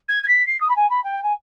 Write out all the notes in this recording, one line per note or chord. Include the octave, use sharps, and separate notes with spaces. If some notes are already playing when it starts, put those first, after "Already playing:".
G#6
G#6
B6
C7
D#6
B5
G#5
B5
G5
G#5